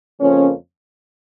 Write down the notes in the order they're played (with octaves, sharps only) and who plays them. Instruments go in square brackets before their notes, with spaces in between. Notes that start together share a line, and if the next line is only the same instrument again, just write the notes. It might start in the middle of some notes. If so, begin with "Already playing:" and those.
[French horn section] F2 C#3 F3 A#3 C#4